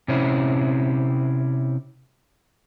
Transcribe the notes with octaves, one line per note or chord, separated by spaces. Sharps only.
C3 C4 C#4 E4